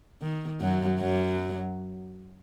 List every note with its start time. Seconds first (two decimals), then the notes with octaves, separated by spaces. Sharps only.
0.22 D#3
0.61 F#2 F#3
1.00 F#2 F#3